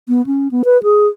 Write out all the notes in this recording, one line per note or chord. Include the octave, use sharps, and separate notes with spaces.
B3
C#4
B3
B4
G#4